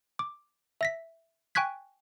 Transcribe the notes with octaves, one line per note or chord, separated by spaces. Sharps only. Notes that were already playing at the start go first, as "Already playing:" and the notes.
D6
E5 A#6 B6
G5 G#5 C#6 F#6 G#6 B6